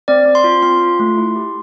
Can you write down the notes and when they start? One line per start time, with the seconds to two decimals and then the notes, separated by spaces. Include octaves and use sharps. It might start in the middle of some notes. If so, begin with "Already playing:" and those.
0.08 C4 D5
0.26 C4
0.35 C6
0.44 F4
0.63 C4 C6
0.81 F4
1.00 A3
1.18 E4
1.36 G4